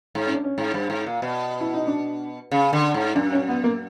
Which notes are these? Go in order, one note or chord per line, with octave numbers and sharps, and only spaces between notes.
G#2
C#4
D4
C#4
G#2
G2
G#2
A#2
B2
E4
D#4
D4
C#3
D3
G#2
F#2 D4
C#4
B3
A#3